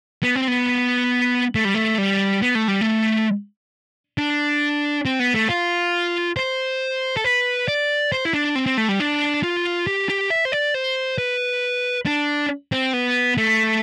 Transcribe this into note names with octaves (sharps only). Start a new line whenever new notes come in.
B3
C4
B3
A3
G3
A3
G3
B3
A3
G3
A3
D4
C4
B3
A3
F4
C5
A4
B4
D5
C5
E4
D4
C4
C4
A3
G3
D4
F4
G4
G4
E5
C5
D5
C5
B4
D4
C4
B3
A3